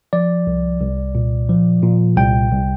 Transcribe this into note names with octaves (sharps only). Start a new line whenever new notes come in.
F3 D5
C2
C2
A#2
F3
A#2
C2 G5
C2